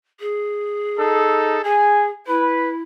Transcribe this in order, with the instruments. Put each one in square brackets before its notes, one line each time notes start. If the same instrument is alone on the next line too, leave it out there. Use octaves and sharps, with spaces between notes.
[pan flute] G#4
[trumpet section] D#4 A4
[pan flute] G#4 [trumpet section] G#5
[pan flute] E4 [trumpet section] B4